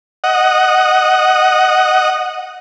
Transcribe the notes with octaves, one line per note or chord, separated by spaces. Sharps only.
D#5 F#5